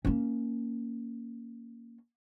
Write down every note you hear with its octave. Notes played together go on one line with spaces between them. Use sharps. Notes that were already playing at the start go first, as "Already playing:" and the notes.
A#3 C#4